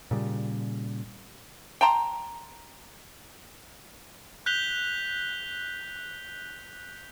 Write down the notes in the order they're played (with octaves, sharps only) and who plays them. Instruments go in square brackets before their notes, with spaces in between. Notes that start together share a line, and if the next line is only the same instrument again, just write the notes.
[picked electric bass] A#2 C#3 G3
[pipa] G5 A5 A#5 C6
[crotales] F#6 G6 B6 F7 G7